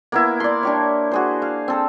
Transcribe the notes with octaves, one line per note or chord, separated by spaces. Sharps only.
A#3 B3 E4
D5 C6
D4 G4 C#5
F#4 G#4 C5
F5
C4 A4